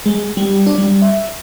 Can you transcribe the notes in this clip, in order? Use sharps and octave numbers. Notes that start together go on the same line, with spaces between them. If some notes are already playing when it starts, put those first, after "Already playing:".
G#3
G3
D4
G3
E5